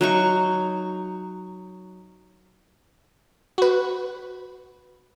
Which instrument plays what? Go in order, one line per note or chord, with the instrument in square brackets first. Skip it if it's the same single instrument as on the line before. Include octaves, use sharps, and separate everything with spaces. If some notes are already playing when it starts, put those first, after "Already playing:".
[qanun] F#3 D#4 C#6
[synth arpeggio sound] F#4 B4